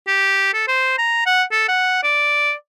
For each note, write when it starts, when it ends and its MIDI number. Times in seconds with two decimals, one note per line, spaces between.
0.07 0.52 67
0.54 0.68 69
0.68 0.97 72
0.98 1.25 82
1.26 1.43 78
1.51 1.67 69
1.68 2.02 78
2.03 2.53 74